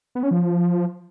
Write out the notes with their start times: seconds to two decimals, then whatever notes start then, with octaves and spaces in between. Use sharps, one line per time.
0.15 B3
0.23 C#4
0.31 F3